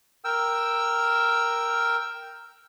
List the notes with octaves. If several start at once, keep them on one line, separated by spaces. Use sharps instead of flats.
A#4 G5 E6